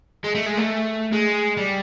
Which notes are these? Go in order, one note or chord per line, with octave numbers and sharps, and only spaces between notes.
G#3
A3
G#3
A3
G#3
G3